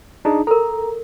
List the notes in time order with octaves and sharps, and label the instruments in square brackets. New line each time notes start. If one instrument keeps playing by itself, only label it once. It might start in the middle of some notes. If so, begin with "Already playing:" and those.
[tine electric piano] D4 D#4 G#4
[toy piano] A4 A#4 [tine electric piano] A#5